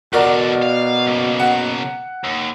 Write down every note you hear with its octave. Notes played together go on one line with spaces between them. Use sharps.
E2 B2 D3 F#4 A#4 D5
F5
C#3 A#3
F#5
D#2